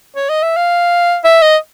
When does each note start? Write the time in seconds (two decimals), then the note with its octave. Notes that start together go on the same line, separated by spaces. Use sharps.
0.16 C#5
0.29 D#5
0.43 E5
0.57 F5
1.24 E5
1.42 D#5